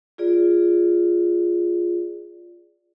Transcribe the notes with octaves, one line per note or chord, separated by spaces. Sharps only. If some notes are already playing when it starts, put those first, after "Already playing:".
F4 G#4 D5